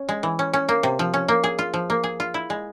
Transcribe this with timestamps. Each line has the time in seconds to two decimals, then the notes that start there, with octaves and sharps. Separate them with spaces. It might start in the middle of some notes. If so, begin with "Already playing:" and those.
Already playing: C#4
0.09 G#3
0.23 E3
0.39 C#4
0.53 C#4
0.69 A#3
0.83 C3
0.99 F3
1.14 C#4
1.28 A#3
1.44 G#4
1.59 F4
1.74 F3
1.90 A#3
2.04 G#4
2.20 F4
2.34 E4
2.50 G#3